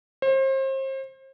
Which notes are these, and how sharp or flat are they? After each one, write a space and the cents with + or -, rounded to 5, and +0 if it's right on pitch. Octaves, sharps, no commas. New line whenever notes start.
C5 +35